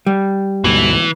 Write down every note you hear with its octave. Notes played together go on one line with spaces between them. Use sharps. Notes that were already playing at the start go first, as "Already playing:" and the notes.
G3
D2 G#2 B2 E3